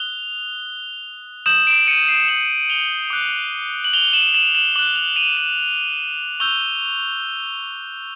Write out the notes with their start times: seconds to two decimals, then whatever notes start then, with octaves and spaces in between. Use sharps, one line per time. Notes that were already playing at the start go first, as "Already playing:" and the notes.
Already playing: D#6 F#6 F7 G7
1.46 D#6 G6 E7 F#7
1.67 D7 E7
1.87 C#7 D#7
2.07 C7 D7
2.28 E7 F#7
2.70 F7 G7
3.10 D6 F#6
3.84 F#7
3.93 F7 G7
4.13 E7 F#7
4.34 E7 F#7
4.55 E7 F#7
4.75 D6 F#6 E7 F#7
4.96 F7 G7
5.16 D#7 F7
5.37 E7 F#7
6.40 C#6 E6 G6 F7 G7